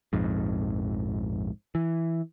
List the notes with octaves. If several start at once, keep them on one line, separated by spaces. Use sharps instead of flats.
A#1 F2 G#2
E3